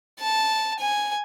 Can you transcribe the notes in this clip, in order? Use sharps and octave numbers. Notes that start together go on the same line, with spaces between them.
A5
G#5